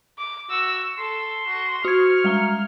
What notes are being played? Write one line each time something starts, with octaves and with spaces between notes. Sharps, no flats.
D6
F#4 E6
A4 C6
F#4
F#4 C#6 F6 G#6
G3 G#3 A#5